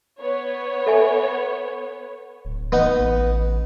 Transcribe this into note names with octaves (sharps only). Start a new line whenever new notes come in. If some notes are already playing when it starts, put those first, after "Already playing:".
B3 C#5
A4 E5 G#5
D1
D1 B3 D#4
A1